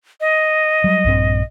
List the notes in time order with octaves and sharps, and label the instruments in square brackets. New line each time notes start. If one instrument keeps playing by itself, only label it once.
[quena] D#5
[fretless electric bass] F#3 G3
A#1 G2 C4